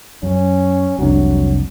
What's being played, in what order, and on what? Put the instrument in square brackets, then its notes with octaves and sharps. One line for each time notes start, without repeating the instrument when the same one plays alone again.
[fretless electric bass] F#2 [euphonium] C#4
[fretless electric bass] F1 C2 D4 [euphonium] F#3